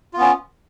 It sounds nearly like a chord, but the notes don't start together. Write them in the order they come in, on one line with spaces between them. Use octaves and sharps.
F4 B3 C#4